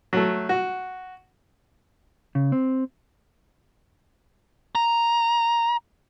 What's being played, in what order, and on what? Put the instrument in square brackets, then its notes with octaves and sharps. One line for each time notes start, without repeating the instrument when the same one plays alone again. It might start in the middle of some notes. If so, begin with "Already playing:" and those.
[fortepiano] F#3 A3
F#4
[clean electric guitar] C#3
C4
[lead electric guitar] A#5